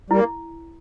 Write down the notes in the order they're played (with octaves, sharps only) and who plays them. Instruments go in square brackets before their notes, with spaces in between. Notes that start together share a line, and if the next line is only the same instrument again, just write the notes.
[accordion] G3 [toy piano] E4
[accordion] A#3